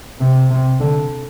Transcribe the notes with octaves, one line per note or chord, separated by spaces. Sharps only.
C3
C3
D3